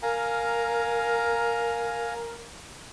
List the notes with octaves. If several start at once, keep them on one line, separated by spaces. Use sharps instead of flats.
A#4 F5 G#5 A#5